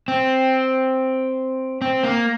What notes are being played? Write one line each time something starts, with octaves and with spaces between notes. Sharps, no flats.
C4
C4
A#3